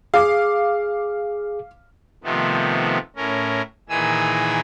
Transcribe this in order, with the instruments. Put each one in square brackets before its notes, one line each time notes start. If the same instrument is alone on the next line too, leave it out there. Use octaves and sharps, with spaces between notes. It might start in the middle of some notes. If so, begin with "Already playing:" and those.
[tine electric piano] G#4 [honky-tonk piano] F5 D6
[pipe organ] C3 D#3 F3 A3 B3
A2 C#4 A#4
A#2 D#3 E3 G#4 G#5 E6